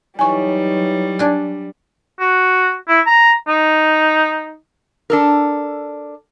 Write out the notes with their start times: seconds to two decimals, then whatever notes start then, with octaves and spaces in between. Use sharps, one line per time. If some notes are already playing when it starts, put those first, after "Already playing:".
0.19 E3 F#3 G3 D#4 C#5 G#5 C#6
1.19 D4 G#5
2.20 F#4
2.89 E4
3.07 A#5
3.48 D#4
5.10 D4 A4 A#4